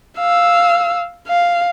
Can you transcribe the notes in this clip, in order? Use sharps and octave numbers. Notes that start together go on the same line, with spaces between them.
F5 E6
F5